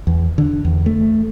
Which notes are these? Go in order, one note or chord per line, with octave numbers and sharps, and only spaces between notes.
E2
D3
E2
A3